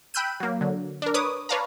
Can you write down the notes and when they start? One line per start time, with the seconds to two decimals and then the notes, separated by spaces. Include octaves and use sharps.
0.14 G5 B5 E6 F#6 G6 D#7
0.40 F#3 A#3
0.61 D3 F#3
1.02 D4 A#4
1.14 B4 C#5 D6 D#6
1.49 B4 C#5 D5 F5 A5 A#5